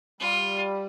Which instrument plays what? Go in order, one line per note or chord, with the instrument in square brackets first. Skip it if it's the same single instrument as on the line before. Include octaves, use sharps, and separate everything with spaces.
[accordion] G3 [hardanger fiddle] F4